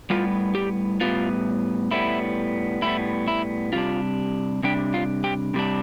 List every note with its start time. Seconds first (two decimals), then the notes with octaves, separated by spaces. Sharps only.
0.10 A2 G3 B3 F4
0.55 G4
1.01 A2 G3 B3 F4
1.91 A2 G3 B3 E4
2.82 A2 G3 B3 E4
3.28 E4
3.73 C3 G3 D4 F4
4.63 C3 G3 D4 G4
4.94 F4
5.24 G4
5.54 C3 G3 D4